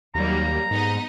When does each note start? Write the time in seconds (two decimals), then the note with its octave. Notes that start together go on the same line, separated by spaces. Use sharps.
0.15 D#2 F#3 G3 A#3 A#5
0.71 G#2 B3 D#4 D#5